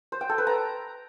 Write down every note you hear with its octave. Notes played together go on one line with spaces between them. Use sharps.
C5
G5
A4
B4
A#5